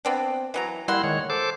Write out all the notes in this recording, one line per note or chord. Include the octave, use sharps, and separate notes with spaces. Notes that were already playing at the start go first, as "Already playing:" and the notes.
B3 C4 D4
E3 F#3 A#5
G3 A#3 E4 F#5 C6
D#3 G#3 C#5
A4 C5 D6